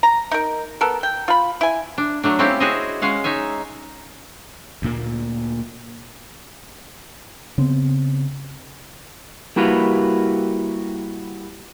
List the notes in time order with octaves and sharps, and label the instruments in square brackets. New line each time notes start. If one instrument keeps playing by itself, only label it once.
[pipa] A#5
D#4 A#4
B3 A4 A#4
G5
F4 B5
E4 G#5
[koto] D4
F#3 A3 D4
C4 C#4 E4 F4 G4 A4
E4 F#4 G#4 C5 C#5 D#5
G#3 C#4 F5 F#5
D#4 C#5 E5 G#5
[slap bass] D2 A#2 A#3
[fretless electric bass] C#3 B3 C4
[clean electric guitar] G3 A#3 E4 F#4 B4 F5